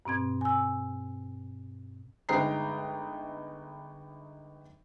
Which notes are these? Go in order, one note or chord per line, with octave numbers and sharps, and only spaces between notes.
G2 B2 C4 G#6
G#5 E6
G1 G#3 D#4 G5 A#5 C7